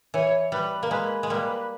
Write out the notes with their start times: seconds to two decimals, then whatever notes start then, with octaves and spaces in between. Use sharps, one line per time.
0.14 E3 C#5
0.52 G3 B4
0.83 A#3
0.91 G#3 B4
1.23 G#3
1.30 G3 A#3 B4